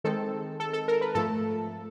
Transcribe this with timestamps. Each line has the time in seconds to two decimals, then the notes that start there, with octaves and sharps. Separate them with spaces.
0.04 D#3 G#3 C4 A4
0.60 A4
0.73 A4
0.88 A#4
1.01 B4
1.15 G#2 F3 A3 A4